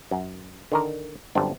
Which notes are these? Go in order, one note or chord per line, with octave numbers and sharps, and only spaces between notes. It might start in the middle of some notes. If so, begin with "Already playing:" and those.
F#2
D3 D#3 A#4
G1 F#2 C4 D4